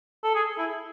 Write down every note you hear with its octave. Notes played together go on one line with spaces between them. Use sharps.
A4
G#4
E4